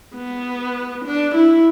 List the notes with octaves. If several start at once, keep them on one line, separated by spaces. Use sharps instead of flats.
B3
D4
E4